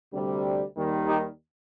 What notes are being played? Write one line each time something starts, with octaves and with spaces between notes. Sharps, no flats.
D2 C3 G3
D#2 D#3 G3
D#4 G4